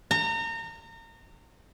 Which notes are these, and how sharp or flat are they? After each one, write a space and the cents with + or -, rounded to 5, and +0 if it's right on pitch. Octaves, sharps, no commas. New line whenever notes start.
A#5 -30